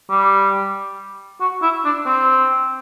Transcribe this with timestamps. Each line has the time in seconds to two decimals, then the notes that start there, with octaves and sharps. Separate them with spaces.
0.10 G3
1.41 F#4
1.62 E4
1.85 D4
2.06 C4